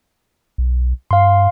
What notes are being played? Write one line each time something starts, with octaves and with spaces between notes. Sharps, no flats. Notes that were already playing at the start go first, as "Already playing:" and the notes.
B1
G2 F5 C6